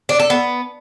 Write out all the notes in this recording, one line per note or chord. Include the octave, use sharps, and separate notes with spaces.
D4
A4
B3